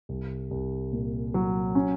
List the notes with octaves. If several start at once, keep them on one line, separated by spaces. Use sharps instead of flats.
C2
C2
A#2
F#3
C#4